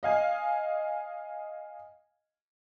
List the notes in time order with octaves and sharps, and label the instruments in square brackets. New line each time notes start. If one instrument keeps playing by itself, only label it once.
[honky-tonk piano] D#5 F5 G#5